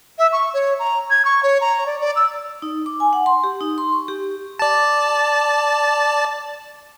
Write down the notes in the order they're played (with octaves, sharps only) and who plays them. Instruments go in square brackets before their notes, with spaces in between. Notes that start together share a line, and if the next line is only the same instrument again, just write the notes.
[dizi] E5
C#6
C#5
A#5
G#6
C#6
C#5
A#5
D5
D5
E6
[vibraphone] D#4
D6
G#5
F#5
C6
G4
D#4
C6
C#6
G4
[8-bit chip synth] D5 A5